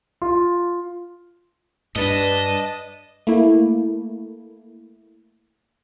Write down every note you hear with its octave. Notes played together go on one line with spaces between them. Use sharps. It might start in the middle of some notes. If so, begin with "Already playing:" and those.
F4
G2 D4 B4 D#5 A5
A3 A#3 E4